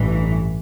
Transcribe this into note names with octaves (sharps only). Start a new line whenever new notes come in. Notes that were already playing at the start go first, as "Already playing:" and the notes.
Already playing: A1 G2 E3